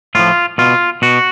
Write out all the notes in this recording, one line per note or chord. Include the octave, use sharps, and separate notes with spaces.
A2 F3 F4
B2 F4
B2 F#4